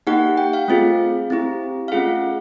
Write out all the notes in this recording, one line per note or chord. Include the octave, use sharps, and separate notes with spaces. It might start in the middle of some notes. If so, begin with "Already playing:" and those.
A#3 D#4 G4 F#5
G5
F5
A3 C4 F4 G#4
C4 E4 G4
F5
A3 C#4 F4 G#4 F#5